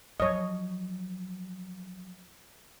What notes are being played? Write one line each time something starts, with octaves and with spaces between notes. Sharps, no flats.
F3 F#3 C#5 D#5